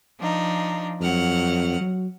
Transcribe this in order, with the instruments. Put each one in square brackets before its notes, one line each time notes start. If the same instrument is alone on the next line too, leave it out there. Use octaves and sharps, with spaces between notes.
[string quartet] F3 D4 D#4
[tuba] F2 [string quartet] F#3 F#5 F6
[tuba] F#3